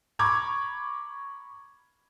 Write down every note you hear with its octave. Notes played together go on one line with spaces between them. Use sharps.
A#5 B5 C#6 D6 G#6